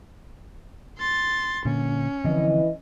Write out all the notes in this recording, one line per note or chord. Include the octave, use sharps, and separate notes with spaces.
C6 A6
A#2 D3 A#3 C#4
D3 E3 F3 C4 D#5